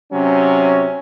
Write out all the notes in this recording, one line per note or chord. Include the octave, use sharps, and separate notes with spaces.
C3 F#3 C#4